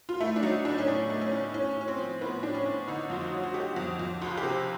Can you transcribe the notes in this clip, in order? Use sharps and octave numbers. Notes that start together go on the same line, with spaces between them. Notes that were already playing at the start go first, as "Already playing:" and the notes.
F4
A3 E4
D4
F#3 D#4
A2 D4
C#4
A2 D4
A3
C#4
A2
A2 C#4
A2 C#4
C4
F3
A2 B3
A2 D4
C#4
A2
D3 D#4
F2 F4
F#4
F#3
F#4
F#3 G4
F2
F2
C#2 F4
G4
C3